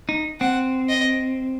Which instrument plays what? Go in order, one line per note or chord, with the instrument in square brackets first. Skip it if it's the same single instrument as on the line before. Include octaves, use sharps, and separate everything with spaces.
[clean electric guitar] D#4
[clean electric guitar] C4 [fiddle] F#5
[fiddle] D#5